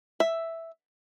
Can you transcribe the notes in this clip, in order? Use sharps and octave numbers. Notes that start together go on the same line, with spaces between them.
E5